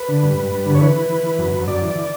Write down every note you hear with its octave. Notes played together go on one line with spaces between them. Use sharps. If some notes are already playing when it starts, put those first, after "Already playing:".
Already playing: B4
D3
G2
G2
G2
D3
C#5
E3 B4
E3
E3
E3
F#2
F#2
F#2 D5
E3
E3